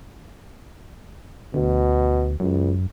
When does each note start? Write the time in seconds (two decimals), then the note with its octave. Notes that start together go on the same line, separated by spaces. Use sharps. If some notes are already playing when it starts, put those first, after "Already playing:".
1.54 D2 B2
2.40 C#2 F#2